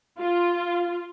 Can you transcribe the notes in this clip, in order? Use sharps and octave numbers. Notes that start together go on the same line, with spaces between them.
F4